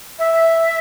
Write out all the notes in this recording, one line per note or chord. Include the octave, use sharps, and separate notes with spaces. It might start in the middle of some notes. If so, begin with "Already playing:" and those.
E5